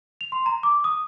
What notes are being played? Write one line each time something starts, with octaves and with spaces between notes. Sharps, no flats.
F7
C6
A#5
D6
D#6